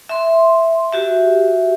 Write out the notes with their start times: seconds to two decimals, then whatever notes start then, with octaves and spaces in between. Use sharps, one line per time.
0.09 E5 C6
0.92 F#4 G4 E5